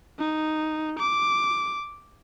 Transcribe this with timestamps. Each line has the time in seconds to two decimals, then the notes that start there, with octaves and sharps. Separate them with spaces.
0.18 D#4
0.99 D6